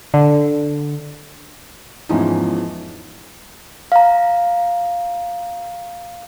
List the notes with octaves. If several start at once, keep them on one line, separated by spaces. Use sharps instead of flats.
D3
E2 G#2 E3 F3 C#4 D#4
F5 A#5